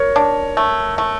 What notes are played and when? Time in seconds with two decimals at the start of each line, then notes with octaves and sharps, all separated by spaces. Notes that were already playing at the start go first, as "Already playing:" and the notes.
Already playing: A#4 C#5
0.16 D4
0.57 A3
0.98 A3